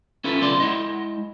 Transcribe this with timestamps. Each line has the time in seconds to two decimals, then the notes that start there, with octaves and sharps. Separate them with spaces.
0.24 C#4 E4 F4 A4 B4
0.41 B1 C#3 A3 F4 D5 C6
0.60 G#3 E4 D#5